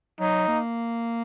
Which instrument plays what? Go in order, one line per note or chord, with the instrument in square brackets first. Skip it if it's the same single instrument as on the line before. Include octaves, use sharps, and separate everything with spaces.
[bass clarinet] F#3 [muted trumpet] D#4
[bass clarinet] A#3